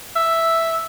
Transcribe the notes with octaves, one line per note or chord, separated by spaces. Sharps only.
E5